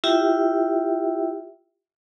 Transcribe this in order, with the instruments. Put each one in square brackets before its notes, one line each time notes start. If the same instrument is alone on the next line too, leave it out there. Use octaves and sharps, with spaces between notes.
[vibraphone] E4 F4 G4 E5 G5